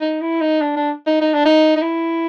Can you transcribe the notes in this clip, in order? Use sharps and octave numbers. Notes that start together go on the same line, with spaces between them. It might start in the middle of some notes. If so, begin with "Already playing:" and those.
D#4
E4
D#4
D4
D4
D#4
D#4
D4
D#4
D#4
E4